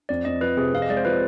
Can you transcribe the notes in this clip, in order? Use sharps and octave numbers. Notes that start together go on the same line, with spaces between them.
F2 D5
F2 D#5
F3 B4
C3 G#4
F2 F5
D#5
G#3 D5
C5
F3 B4